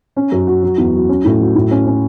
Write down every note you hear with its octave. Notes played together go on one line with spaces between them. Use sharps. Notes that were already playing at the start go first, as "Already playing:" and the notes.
C#4
F#2
F#4
F#3
E2
F#3
C#4
A2
F#3
A2
C#4
C#4